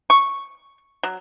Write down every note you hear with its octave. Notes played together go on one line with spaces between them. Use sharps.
C#6
F#3